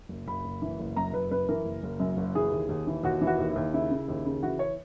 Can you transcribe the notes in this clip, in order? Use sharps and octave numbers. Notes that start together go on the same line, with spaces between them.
F#1
F#1 B5
F#1
E3
F#1
F#2 A#5
F#1 B4
F#2 B4
E3 A#4
F#1
F#1
F#2
F#1
E3 G#4
D#2
D#2
E3
D#2 F#4
E3
F#4
D#2
E4
D#2
C#3 E4
C#3
D#2
C#3
E3 F#4
C#5